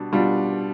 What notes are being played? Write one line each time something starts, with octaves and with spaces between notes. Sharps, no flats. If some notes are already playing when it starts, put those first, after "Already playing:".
Already playing: B2 G3 D4
B2 G3 D4 F4